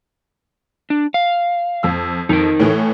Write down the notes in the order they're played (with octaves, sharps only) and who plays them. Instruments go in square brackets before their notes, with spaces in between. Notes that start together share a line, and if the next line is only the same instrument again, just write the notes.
[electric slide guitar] D4
F5
[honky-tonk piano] F2 E6
[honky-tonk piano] F2 [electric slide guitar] D#4 A#4
[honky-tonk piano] A2 E3 A3